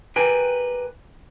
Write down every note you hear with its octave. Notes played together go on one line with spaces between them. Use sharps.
G4 A#4 B4 G5 G#5